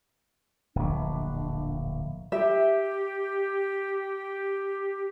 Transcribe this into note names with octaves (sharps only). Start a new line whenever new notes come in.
D1 A#1 D4
G4 E5